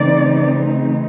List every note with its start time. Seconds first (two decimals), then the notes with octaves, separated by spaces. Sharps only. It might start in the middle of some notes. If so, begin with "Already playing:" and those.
Already playing: C#3 E3 A3 C4 D#4 D5